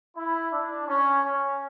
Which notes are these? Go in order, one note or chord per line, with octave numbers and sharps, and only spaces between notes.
E4
D4
C#4
C#4